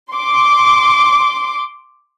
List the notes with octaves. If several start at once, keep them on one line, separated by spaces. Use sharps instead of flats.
C6 D6